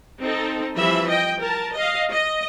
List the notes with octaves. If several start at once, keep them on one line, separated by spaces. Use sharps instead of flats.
C4 D#4 A4
E3 F3 G3 E5 B5
D#5 G5
A#4 A5
D#5 F5
D#5